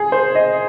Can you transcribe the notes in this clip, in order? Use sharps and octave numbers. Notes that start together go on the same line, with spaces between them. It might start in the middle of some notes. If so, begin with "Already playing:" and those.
Already playing: G#4
C5
D#5